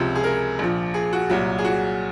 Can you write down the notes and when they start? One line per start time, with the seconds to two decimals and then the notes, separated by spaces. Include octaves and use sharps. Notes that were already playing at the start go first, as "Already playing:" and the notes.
Already playing: C#2 C3 F3
0.15 G#4
0.24 A#4
0.59 A#1 A#2 F3
0.94 G#4
1.13 F#4
1.30 C2 A#2 F#3
1.58 G#4
1.64 F#4